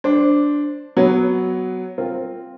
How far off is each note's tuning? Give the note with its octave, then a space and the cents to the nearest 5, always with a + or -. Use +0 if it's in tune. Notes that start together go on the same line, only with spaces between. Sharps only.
D4 -5 C5 +0
F#3 +5 B3 +0
C4 +0 F4 +0 A#4 -15